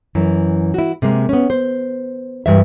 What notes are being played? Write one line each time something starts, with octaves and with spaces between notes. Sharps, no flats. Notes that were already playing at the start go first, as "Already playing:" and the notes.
F#2 E3
E4 F#4
C3 G#3 A#3
B3 C#4
C5
G2 E3 E5